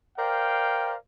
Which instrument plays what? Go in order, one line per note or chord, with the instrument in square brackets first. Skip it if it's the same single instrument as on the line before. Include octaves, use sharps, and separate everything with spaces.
[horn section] A#4 C5 D5 F5 G5